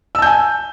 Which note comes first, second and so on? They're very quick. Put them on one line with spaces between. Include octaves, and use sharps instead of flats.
E6 A5 G6 G#5